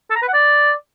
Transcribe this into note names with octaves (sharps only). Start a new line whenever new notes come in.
A4
A#5
B4
F#5
D5